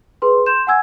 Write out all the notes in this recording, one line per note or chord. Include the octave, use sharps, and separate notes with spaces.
G#4 B4 C6
C6 G6 E7
F#5 G#5 E6 G#6